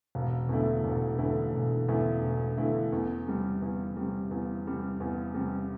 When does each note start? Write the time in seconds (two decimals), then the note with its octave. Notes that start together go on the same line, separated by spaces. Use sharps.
0.15 E1
0.49 E2 D3 A3 E4
0.84 E1
1.18 E2 D3 A3 E4
1.54 E1
1.88 E2 D3 A3 E4
2.22 E1
2.57 E2 D3 A3 E4
2.92 E2
3.27 C3 G3
3.62 E2
3.97 C3 G3
4.31 E2
4.66 C3 G3
5.00 E2
5.34 C3 G3